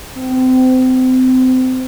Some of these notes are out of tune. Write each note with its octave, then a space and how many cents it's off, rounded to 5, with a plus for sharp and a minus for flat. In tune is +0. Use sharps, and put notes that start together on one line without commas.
C4 -30